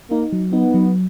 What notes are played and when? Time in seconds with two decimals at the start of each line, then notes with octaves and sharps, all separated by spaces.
0.11 A#3 D#4
0.33 F#3
0.53 B3 D#4
0.74 F#3